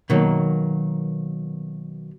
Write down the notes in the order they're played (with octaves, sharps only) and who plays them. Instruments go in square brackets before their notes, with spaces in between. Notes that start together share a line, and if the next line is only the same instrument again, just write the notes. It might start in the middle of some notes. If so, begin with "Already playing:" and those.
[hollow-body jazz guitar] B2 D#3 F#3 A#3